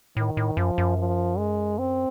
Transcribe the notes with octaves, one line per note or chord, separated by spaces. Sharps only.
A2 D#3
A2
F#2 F3
F#2
F3
G#3
C4